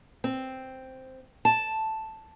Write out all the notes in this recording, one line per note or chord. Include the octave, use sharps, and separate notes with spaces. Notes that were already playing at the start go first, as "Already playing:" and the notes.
C4
A5